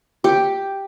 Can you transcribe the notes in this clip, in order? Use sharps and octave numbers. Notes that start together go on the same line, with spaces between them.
G4